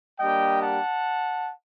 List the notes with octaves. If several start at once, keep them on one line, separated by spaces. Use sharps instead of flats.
G3 A#3 D4 G4 D#5 G5
F#5 A5